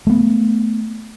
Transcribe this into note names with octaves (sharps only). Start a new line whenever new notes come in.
A3 B3